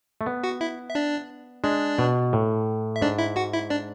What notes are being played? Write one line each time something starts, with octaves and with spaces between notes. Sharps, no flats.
A3
B3
F#4 F#5
E4 E5
E5
D4 D5
G#3 D4 D5
B2
A2
E5
G#2 D4 D5
E4 E5
F#4 F#5
E4 E5
D4 D5